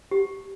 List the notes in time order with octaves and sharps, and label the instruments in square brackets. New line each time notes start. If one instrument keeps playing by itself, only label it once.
[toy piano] G4